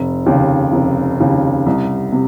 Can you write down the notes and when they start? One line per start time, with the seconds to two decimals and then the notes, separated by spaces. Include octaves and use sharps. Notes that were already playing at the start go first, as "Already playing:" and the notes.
Already playing: F1
0.26 D#2 C#3
0.73 F1
1.20 D#2 C#3
1.66 C2
2.12 C3